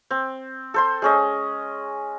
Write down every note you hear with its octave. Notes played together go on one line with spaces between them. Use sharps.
C4
A4 C5 C6
G#3 C#4 D#5